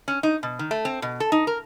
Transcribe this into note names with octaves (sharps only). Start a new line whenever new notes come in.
C#4
D#4
B2
D#3
A3
C4
B2
A4
D#4
A#4